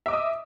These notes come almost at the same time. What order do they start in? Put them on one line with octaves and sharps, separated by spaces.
E5 D6 D#5 D#6